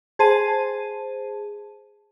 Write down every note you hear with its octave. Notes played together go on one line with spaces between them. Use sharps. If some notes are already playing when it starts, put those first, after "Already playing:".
G#4 C5 A5 D#7